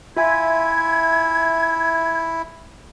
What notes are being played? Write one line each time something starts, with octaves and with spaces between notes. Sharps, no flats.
E4 F4 E5 G#5 G#6